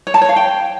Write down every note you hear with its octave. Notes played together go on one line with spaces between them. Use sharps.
C#5
A5
C#5
F5
G5